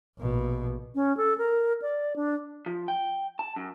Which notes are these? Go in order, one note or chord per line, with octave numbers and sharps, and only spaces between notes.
A#1 B2
C#4
A4
A#4
D5
D4
F3
G5
A5
F#2